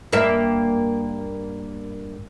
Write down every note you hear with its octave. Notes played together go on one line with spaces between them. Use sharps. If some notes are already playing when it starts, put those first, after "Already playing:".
G2 A#3 E5